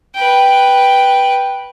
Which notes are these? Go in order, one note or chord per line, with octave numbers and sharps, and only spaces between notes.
B4 G5